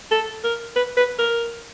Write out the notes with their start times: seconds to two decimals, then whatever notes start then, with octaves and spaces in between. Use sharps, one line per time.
0.11 A4
0.44 A#4
0.76 B4
0.97 B4
1.19 A#4